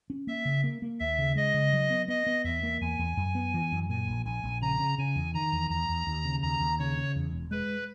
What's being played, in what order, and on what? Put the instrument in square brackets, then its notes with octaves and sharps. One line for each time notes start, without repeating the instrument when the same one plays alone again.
[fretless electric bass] C#4
[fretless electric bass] A#3 [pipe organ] E5
[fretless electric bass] C#3
A#3
A#3
[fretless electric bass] D#2 [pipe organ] E5
[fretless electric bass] C#3
[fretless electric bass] G#3 [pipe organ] D#5
[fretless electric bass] C#3
F#3
B3
[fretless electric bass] B3 [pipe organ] D#5
[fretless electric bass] B3
[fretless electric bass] E2 [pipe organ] E5
[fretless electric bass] A#3
[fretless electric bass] E2 [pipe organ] G#5
[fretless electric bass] E2
F#2
B3
E3
F#2
[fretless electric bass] A#2 [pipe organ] G#5
[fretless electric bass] A#1
[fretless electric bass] A#1 [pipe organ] G#5
[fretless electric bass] A#1
[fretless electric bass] C#3 [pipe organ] A#5
[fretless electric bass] C#3
[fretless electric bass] C#3 [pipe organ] G#5
[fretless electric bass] E2
[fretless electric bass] D#3 [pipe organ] A#5
[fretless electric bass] E2
[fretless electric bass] E2 [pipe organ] A#5
[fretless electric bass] E2
D#2
C#3
[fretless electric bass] D#2 [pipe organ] A#5
[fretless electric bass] D#2
[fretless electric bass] C#3 [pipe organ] C#5
[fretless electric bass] C#3
E2
E1
[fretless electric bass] G#3 [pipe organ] B4